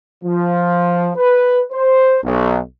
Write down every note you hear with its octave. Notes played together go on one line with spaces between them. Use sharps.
F3
B4
C5
B1